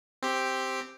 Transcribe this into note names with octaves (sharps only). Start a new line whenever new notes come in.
C4 G4